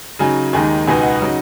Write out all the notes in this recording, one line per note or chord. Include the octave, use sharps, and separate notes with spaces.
C#3 F#3 D#4 G#5
D#2 D#3 G#3 D#4 G#5
C#2 B2 B3 D#4 G#5
F#5
C#3 F#3 D#4